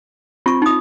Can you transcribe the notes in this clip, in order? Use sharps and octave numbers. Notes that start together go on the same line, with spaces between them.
C4 F4 C#6
D#4 D#6